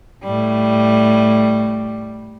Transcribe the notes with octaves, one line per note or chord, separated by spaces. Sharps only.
A2 G3